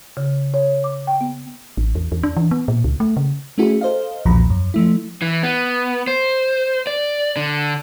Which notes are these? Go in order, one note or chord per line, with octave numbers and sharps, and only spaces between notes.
C#3
C#5
D6
G5
B3
A1
E2
E2
D4
E3
B3
A#2
C#2
A3
C#3
A3 C#4 E4 F#4 G#4
A4 C5 D#5 F5
B1 E2 A#2 F3 A#5 B5
F#2
F3 A3 E4
E3
B3
C5
D5
D3